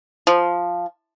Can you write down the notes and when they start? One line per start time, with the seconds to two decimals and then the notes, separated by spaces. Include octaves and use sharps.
0.27 F3